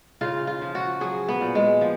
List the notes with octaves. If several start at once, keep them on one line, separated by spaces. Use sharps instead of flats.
C#3 F4
F4
F3
F#4
F#3 G#4
B3
A#2
G#3
F3